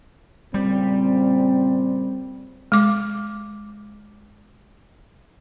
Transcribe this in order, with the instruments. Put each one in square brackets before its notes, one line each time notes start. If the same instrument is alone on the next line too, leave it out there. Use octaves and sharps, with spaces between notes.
[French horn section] A#2 C#3 C4 [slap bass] G3
[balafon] G#3 D6